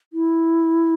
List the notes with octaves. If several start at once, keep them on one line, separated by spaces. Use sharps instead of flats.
E4